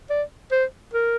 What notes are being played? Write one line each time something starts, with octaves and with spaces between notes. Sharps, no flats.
D5
C5
A#4